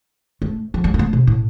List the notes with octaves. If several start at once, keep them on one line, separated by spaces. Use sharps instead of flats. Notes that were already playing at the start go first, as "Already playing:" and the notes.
A3
F3
G3
A#3
A3
C3
A2